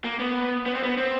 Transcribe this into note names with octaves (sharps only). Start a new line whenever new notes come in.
A#3
B3
B3
C4
B3
C4